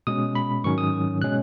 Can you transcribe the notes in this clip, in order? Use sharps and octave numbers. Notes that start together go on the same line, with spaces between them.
B2 G#3 C#4 D#6
B5
G#2 D#3 F#3 C#4 C#6
D#6
B2 G#3 C#4 F#6